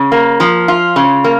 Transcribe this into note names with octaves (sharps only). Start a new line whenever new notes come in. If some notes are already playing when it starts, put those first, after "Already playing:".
Already playing: C#3
A#3
F3
F4
C#3
A#3